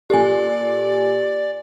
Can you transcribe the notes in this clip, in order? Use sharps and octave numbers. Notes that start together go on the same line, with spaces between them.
A#2 G4 A4 D5 G#5